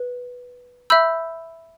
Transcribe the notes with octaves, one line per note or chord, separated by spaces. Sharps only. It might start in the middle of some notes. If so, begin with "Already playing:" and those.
Already playing: B4
E5 B5 E6 G6